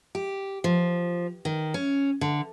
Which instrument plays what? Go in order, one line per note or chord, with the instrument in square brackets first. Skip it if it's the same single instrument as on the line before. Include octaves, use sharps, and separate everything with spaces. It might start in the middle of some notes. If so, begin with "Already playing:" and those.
[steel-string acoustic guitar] G4
F3
D#3
C#4
D3